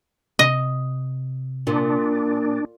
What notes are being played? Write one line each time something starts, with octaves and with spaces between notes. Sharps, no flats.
C3 D#5
A#2 D4